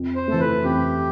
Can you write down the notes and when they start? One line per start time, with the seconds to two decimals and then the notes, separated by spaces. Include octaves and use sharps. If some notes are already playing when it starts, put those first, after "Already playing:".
Already playing: F2
0.15 C5
0.28 E3 A3 A4
0.40 B4
0.64 F2 G4